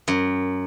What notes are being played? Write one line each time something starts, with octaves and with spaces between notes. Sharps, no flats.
F#2